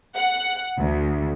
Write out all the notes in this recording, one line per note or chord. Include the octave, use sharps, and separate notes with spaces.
F#5
D2